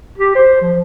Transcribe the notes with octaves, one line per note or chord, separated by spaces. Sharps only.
G4
C5
F3